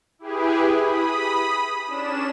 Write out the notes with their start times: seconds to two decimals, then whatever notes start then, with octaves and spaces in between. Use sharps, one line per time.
0.19 E4 G4 G#4 B4
0.75 B5 D#6
1.87 C#4 D4 E7